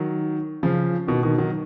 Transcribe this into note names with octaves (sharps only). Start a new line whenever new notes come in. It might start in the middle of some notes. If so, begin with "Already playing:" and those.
Already playing: D#3 F#3
C#3 F3
B2 D#3
B2 D#3
D#3 F#3